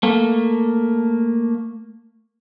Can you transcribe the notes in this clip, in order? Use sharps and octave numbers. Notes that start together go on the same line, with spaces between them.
A3 A#3